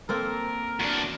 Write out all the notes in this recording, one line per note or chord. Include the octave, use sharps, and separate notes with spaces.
A#3 C4 A4 A#4
E2 D4 F#4